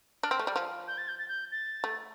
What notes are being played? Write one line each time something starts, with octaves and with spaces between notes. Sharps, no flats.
D4 F6
C4
A3
G3
F3
G6
A6
G6
A6
G6
A6
A3